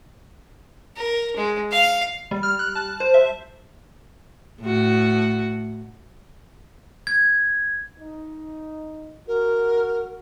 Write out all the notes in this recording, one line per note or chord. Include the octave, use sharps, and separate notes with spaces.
A#4
G#3
F5
G3
F6
F#6
A5
C5
E5
A2 F#4
G#6
D#4
F#4 A#4